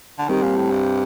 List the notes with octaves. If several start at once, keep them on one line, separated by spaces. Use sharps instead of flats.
D3
D#3 G3 C4 G4
A#2
A2
G2